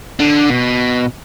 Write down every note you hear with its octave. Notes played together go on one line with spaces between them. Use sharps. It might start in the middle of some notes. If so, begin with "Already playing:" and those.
D3
B2